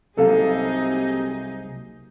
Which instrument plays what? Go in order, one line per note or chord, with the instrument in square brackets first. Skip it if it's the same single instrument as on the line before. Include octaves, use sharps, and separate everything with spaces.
[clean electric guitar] C2 F#3 A#3 [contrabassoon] C3 [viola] D#4 G#4 [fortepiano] A4 F5